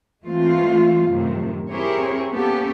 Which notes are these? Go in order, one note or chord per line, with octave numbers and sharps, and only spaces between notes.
E3 G#3 A3 C4 F4
F#2 A2 C3 D#3
C4 E4 G4 G#4 A#4 C#5
A#3 B3 C#4 G4 A4